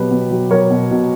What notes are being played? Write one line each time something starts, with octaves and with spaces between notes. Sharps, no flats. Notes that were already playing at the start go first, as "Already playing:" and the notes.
Already playing: B2 F#3 G4 B4
B2
F#3
F#3 A#4 C#5
B2
B2